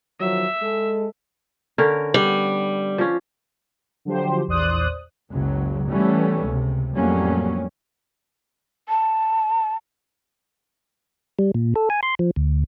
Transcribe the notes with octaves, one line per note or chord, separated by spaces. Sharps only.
D#3 F3 F#3 E5
G#3 A4
D3 C#4 A#4
G3 B3
F3 C#4
D3 F3 F#3 G4 C5
A#1 E2 C5 D5 D#6 F#6
F#1 C#2 C#3 F#3
E3 G3 A3 B3 C#4
C#2 C3
F2 A2 F#3 G3 A#3 C#4
A5
G3
A#2
A4
G#5
C6
F3
D2